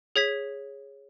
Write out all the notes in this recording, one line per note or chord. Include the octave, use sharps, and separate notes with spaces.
G#4 C#5 G#6 B6